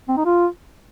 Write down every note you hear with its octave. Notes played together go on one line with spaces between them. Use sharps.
C4
D#4
F4